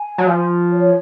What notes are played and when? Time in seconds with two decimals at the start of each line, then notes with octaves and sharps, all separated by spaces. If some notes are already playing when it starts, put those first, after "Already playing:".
Already playing: G#5
0.18 F#3
0.27 F3
0.72 C#5